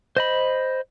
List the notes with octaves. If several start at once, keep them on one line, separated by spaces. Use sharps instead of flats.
C5 D#5 B5